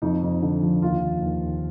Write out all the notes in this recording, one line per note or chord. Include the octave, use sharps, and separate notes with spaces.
F2 D#4
F2
D3
F3
D#2 F4
D#2
D#2
D#2